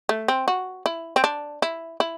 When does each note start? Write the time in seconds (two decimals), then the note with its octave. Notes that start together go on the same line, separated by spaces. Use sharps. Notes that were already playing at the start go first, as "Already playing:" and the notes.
0.09 A3
0.28 C4
0.48 F#4
0.86 E4
1.16 C4
1.24 D4
1.62 E4
2.00 E4